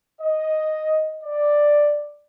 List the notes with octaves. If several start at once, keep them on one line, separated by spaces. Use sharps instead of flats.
D#5
D5